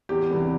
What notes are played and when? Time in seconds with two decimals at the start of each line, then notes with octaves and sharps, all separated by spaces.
0.09 E2 G4
0.31 C3 E3 G3 B3